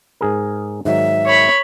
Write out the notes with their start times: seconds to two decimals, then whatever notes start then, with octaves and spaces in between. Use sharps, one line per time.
0.21 G#2 G#4 A#4
0.85 G#2 D#3 F#3 E5
1.26 C#5 B5